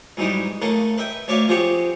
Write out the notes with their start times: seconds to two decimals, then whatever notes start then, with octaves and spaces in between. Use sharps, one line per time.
0.17 G#2 E3 F#3 G3 D#4 E4
0.62 C#3 A3 A#3 A4 A#4 D#6
0.98 B4 D#5 E5 G5
1.28 D2 C#5 D5 E5 F5 G#5
1.48 F3 B3 C4 G4 G#4 C#5